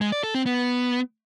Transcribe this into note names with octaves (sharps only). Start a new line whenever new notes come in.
G#3
D5
A4
C4
B3